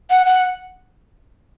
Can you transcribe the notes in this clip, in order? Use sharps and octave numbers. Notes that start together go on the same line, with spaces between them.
F#5
F#5